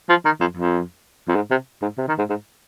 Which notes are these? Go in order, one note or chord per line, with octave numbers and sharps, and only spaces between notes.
F3
D#3
F2
F2
F2
G#2
C3
G#2
C3
D#3
G#2
G#2